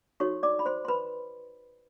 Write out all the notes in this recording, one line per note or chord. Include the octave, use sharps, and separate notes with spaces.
D#4 F#4 A4 C#5 C#6
D5 D6
B5
C5 C6
C6
B4 B5